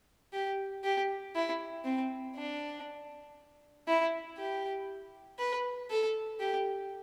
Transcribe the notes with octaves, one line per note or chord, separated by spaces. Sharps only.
G4
G4
E4
C4
D4
E4
G4
B4
A4
G4